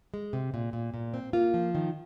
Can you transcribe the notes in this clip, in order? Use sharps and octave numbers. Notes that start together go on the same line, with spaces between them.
G#3
C3
A#2
A#2
A#2
C4
A#3 F4
F3
D#3